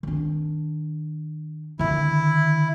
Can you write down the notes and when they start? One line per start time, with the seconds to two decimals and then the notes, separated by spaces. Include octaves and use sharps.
0.03 D#3 D4
1.79 D3 D#3 E4